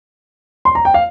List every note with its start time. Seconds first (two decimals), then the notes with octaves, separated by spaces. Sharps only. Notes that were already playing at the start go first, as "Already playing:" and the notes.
0.65 C6
0.75 A#5
0.85 G5
0.94 F5